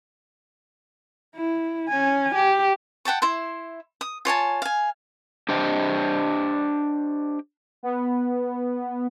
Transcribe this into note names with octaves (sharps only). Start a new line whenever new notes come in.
E4
C#4 G#5
G4
F#5 G5 A5 C#6
E4 E5 C6
D#6
F4 C#5 G#5 A5
F5 G#5
D4 G4 C5 D#5 G5
B3